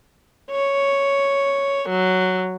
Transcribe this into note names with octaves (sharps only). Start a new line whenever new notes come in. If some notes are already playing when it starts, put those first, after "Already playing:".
C#5
F#3